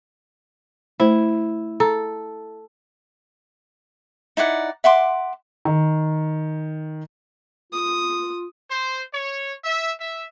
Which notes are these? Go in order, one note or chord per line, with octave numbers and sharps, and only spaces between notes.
A3 E4 C5
A4 A#5
D#4 E4 D5 F#5
E5 F#5 C6 D6
D#3
F4 D#6
C5
C#5
E5
E5